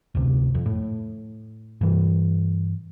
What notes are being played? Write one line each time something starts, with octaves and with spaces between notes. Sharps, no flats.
F1 D2 C3
F2
A2
G2 E3